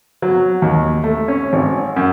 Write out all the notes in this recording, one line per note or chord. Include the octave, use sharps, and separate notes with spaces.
F#3
D#2
A3
C#4
G#1
F#2